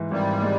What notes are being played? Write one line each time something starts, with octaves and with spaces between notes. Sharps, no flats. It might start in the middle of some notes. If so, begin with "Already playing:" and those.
Already playing: G#2 E3
G#1 G3
G#3